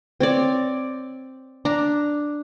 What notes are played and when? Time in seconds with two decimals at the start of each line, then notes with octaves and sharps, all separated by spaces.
0.20 C4 C#5 D5
1.65 D4 A#5